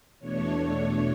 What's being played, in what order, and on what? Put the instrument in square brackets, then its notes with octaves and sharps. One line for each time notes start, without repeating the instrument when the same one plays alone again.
[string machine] E2 B2 A3 D4 C#5